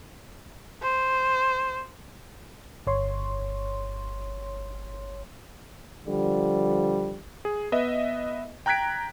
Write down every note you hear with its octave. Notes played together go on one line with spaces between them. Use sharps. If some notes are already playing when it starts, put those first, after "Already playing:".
C5
G1 C#5 C6
D3 F3 G3
G#4
B3 B4 D#5 E5
G5 A#5 F#6 G#6 B6 D7